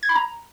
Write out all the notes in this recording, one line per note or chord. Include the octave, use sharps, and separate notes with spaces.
G#6
B5
A#5